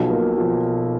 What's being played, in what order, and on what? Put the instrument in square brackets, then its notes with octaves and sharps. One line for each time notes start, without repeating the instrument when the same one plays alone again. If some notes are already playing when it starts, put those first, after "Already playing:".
Already playing: [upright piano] B1 B2 [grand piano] F3
[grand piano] A#3
F3